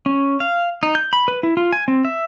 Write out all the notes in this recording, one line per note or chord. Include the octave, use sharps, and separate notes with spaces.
C#4
F5
D#4
G6
B5
B4
E4
F4
G#5
C4
E5